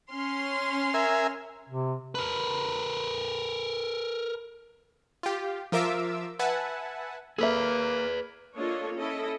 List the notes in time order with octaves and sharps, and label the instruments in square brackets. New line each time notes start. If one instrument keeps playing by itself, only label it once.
[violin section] C#4 C6 F6
[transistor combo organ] A#4 E5 G#5
[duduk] C3
[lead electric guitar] A#4 B4
[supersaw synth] F4 G4
F3 F4 A#4 E5 D6 E6
B4 E5 F#5 G#5 A5
[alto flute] A#3 [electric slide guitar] G#4 B4 [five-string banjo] A4 E5
[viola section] A#3 D4 F4 A4 C#5 D#5
C#4 E4 A4 D#5